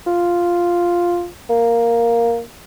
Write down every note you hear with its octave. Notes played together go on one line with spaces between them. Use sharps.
F4
A#3